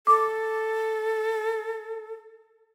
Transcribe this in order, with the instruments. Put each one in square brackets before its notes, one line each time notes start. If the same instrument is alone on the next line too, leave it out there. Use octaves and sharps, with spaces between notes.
[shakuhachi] A4 [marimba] D6